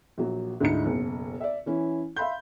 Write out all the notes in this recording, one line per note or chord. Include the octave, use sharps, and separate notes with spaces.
A#1 F#3
D2 G#2 D3 D#4 E4 C#7
F#1 B1
D5 E5
E3 C#4 E4
E5 F5 B5 C6 G6